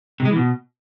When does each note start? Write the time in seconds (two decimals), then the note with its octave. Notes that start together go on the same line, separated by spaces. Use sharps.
0.20 C3
0.25 G#3
0.31 E3
0.36 B2